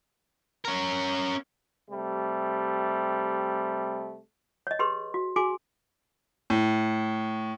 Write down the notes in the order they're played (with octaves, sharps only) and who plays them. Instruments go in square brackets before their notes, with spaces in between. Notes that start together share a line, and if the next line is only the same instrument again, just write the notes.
[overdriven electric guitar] C#4 A#4
[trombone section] C3 G3 A3
[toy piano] C#5 D#5
G4 G#4 B4 C6
F#4
F#4 G#4 G#5 C6 D6
[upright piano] A2